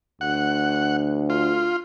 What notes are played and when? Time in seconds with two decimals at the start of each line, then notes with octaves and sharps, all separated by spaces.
0.21 D2 F#5
1.30 F4